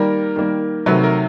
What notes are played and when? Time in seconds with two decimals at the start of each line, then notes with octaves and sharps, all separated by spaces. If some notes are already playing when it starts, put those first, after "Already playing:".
Already playing: D#3 G3 A#3 A#4
0.36 D#3 G3 A#3
0.86 C3 D#3 F#3 A3 B4
1.04 A#4